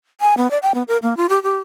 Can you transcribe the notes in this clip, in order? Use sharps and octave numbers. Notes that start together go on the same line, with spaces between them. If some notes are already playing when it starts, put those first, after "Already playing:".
G#5
B3
D5
G5
B3
A#4
A#3
F4
G4
G4